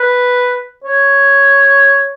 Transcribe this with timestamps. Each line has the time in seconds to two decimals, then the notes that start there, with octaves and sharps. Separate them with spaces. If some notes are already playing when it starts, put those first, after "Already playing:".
Already playing: B4
0.84 C#5